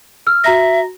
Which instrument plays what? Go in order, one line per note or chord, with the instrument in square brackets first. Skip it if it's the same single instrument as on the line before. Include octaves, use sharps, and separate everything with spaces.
[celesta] E6 F6
[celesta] F#4 A#5 A#6 [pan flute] E5